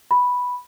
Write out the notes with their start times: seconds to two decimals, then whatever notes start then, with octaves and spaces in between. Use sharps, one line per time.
0.11 B5